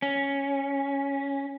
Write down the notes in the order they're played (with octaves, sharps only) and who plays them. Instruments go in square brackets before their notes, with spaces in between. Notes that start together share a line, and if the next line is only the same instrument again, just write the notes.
[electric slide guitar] C#4